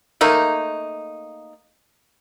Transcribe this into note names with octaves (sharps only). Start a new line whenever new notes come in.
A3 A#3 D#4